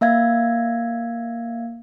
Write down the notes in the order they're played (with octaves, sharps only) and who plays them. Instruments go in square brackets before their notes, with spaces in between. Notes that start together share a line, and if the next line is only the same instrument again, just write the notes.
[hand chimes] A#3 E5 F5 G#6